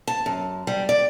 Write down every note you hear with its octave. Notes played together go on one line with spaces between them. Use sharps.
A5
F#2
G3
D5